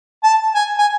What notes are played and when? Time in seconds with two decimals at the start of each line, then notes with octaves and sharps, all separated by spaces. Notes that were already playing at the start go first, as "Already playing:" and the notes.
0.23 A5
0.55 G#5
0.78 G#5